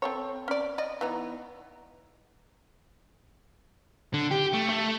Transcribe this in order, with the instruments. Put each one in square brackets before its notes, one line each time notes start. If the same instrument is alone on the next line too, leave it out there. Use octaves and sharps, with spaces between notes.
[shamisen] C4 A4 C#5
C#4 D5
D5 D#5
E3 B3 D#4
[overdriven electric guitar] D3
G4
A3
A3